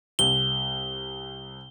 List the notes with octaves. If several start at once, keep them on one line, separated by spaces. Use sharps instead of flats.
C2 G7